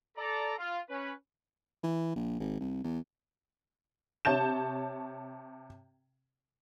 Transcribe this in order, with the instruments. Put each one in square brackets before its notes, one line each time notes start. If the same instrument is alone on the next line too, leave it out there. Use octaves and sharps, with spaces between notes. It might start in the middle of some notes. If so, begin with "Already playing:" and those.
[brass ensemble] A4 D5 A#5
F4
C#4 B4
[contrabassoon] E3
A#1
G#1
C2
E2
[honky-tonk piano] C3 C#5 A5 G6 E7